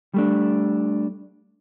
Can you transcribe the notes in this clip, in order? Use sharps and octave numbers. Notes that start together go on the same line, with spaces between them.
G3 A3 D4